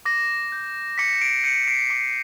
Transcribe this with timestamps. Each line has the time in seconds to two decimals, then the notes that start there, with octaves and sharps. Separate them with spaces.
0.05 D6 A#6
0.52 G6
0.98 D6 B6 C#7
1.21 C7 D7
1.44 G6 C#7 D#7
1.67 C7 D7
1.90 D6